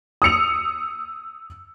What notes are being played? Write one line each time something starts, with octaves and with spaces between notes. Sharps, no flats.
D#6 E6 C#7 F7